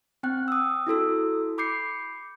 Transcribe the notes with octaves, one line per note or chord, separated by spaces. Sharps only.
C4 G5 F#6
D#6 E6
E4 F#4 A4 E6
B5 D6 G6 C7 C#7